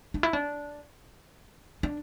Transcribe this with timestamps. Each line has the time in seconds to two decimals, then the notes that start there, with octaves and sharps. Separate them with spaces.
0.14 D4
0.23 E4
0.33 D4
1.83 D4